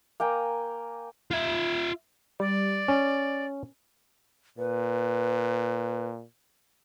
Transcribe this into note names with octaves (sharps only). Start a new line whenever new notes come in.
A#3 G5 G#5 A#5
F4 E5
G3 D5
C#4
A#2 B4